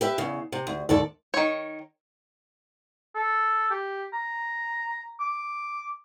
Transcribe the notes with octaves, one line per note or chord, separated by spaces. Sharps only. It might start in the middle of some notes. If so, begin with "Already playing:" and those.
G4 B4 E5
E2 C#3
C3
D2
D#2 G#2 A4 D5
D#3 C#5
A4
G4
A#5
D6